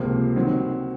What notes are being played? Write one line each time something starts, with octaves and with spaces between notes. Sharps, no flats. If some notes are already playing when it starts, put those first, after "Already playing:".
Already playing: C#2 C3 F3 A#3
D#3 F#3 C4